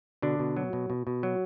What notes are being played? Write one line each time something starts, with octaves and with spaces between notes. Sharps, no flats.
B2 D3 D4
B2
F#3
B2
B2
B2
F#3